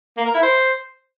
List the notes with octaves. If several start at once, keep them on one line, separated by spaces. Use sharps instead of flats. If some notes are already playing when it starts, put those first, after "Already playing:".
A#3
A#4
E4
C5